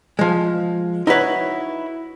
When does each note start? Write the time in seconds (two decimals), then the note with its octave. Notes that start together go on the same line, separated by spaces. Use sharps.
0.19 F3 G#3
1.07 D#4 E4 F#4 B4 C#5